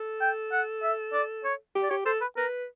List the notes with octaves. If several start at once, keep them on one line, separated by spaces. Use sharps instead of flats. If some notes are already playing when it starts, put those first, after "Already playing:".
Already playing: A4
G5
F#5
E5
D5
C#5
G4
D5
G4 C#5
A4 C5
B4
A#4 B4